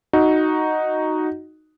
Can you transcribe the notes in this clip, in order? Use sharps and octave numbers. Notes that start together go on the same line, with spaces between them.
D#4 F#4